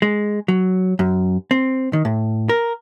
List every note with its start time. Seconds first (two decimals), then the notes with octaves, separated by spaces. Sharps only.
0.02 G#3
0.48 F#3
0.99 F#2
1.51 C4
1.93 D#3
2.05 A2
2.49 A#4